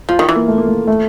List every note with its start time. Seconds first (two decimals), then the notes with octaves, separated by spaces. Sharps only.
0.09 F3 F4
0.19 D#3
0.29 E3
0.36 A#3
0.48 A3
0.58 A#3
0.68 A3
0.87 A3